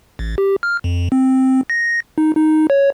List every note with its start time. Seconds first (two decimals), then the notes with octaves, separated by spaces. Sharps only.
0.19 A1
0.38 G4
0.63 F6
0.84 F2
1.12 C4
1.70 A#6
2.18 D#4
2.37 D#4
2.70 C#5